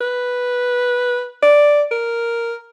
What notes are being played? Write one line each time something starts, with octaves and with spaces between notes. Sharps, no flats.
B4
D5
A#4